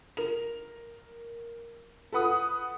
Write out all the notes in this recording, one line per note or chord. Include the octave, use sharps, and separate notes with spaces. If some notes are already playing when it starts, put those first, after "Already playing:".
A#4 F7
A4 B4 F#5 D#6